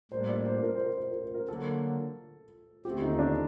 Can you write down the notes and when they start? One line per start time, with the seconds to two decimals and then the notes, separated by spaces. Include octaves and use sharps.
0.12 A2 G3 A#3 D4 C5
0.29 D5
0.47 C5
0.63 A#4
0.75 C5
0.86 A#4
0.98 C5
1.11 A#4
1.22 C5
1.34 A#4
1.48 D3 F#3 A#3 A4
2.85 D#2 D3 A3 C4 G4
3.02 D#4
3.13 D#4
3.19 D4